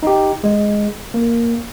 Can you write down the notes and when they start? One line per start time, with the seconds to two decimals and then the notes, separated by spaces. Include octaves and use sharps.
0.03 D#4 G4
0.44 G#3
1.14 A#3